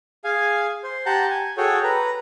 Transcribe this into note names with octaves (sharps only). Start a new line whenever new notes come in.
G#4 F5 G#5
C5
G4 F#5 G5 A5 A#5 G6
G#5
F#4 G#4 A4 C#5 G5
B4 A#5